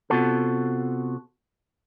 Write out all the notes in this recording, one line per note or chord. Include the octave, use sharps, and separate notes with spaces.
C3 F3 B3 F4 F#4 A4